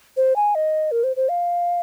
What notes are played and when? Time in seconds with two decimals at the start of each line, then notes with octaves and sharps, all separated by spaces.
0.17 C5
0.36 G#5
0.55 D#5
0.91 A#4
1.04 C5
1.16 C5
1.29 F5